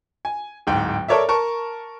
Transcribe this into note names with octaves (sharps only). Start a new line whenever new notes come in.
G#5
D1 G#2 G5
A4 A#4 C#5 D5 E5
A#4 A5 C#6